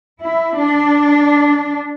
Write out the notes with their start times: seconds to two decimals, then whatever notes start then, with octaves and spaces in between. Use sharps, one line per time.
0.21 E4
0.58 D4